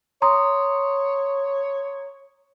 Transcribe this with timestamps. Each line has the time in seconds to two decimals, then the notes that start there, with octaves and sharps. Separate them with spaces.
0.22 C#5 A#5 C6 D#6